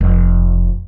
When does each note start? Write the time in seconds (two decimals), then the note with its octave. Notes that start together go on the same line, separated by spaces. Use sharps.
0.01 F1